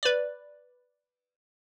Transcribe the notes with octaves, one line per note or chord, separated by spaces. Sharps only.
B4 D5